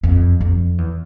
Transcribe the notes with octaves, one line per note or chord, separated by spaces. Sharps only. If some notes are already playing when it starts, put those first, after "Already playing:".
F2
F2
E2